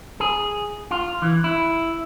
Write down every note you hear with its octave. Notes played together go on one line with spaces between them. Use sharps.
G#4
F4
E3
E4